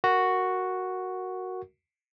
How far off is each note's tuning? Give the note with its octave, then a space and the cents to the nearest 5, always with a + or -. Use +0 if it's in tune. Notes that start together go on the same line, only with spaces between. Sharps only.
F#4 +0 A#4 -5